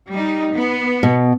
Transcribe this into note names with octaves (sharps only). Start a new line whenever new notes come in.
G3 D#4
B3
B2